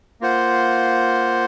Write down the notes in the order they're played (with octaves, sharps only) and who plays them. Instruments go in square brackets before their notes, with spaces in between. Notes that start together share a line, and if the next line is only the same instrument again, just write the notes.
[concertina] A#3 F4 C5 F#5